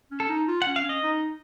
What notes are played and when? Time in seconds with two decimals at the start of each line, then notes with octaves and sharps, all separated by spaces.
0.11 C#4
0.20 A4
0.29 D#4
0.48 F4
0.62 F#5
0.67 C#4
0.76 F5
0.84 C#4 D#5
1.03 D#4